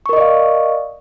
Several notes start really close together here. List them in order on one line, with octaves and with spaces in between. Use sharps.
C#6 A#4 D#5 D5 F5